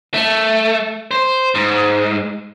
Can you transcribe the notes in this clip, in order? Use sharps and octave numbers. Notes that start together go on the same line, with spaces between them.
A3
C5
G#2